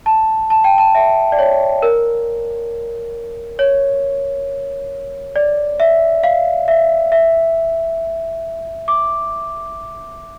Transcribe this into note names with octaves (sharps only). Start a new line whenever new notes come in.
A5
A5
G5
A5
E5
D5
C#5
A#4
C#5
D5
E5
F5
E5
E5
D6